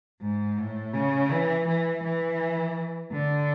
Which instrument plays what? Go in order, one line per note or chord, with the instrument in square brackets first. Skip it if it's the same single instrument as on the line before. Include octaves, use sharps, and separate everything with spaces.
[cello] G#2
A2
C#3
E3
E3
E3
D3